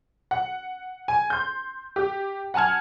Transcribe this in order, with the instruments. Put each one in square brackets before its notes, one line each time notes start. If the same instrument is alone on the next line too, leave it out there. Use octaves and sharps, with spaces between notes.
[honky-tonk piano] F#5
G#5
C6 G6
G4
F#5 G#5 A5 F6 G#6